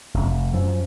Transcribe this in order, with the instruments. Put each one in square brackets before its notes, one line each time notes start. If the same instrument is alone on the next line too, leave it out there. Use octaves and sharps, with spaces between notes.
[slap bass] F1
F#2 F3